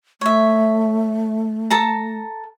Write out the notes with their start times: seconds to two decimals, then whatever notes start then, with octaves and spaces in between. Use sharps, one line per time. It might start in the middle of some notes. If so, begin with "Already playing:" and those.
0.21 A3 C#5 E5
1.70 A4 A5 A#5